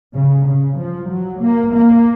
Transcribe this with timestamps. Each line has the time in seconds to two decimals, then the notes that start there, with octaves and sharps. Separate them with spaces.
0.14 C#3
0.45 C#3
0.78 F3
1.09 F#3
1.41 A#3
1.73 A#3